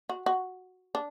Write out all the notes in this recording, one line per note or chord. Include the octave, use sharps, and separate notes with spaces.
F#4
F#4
D4